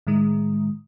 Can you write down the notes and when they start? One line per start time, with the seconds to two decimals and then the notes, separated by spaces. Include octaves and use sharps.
0.07 A2 D#3 G#3